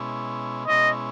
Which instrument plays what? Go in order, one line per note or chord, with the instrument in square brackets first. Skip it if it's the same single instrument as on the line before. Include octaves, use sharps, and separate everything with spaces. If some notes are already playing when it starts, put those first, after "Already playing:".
Already playing: [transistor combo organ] B2 G#3 C#4 E4
[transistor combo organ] B2 G#3 C#4 E4 [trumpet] D#5